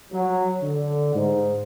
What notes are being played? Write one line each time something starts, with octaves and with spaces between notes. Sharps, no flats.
F#3
D3
G#2